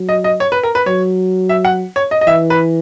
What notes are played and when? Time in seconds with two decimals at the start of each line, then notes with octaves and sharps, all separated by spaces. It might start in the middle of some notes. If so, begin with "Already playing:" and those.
Already playing: F#3
0.09 D#5
0.24 D#5
0.40 C#5
0.52 B4
0.63 A#4
0.75 B4
0.86 F#3 C#5
1.49 E5
1.65 F#5
1.96 C#5
2.11 D#5
2.21 D#5
2.27 E3 E5
2.50 B4